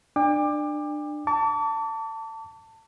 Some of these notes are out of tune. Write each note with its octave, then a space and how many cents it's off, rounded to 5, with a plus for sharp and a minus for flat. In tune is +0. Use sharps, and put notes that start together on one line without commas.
D4 +25 G5 +45 D6 +20
A5 +20 D6 -40